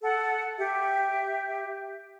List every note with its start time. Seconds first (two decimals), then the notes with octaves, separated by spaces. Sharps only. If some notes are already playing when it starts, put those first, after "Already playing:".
0.03 A4 F#5
0.58 G4 E5